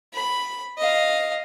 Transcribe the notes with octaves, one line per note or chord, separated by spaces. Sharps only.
B5
D#5 F5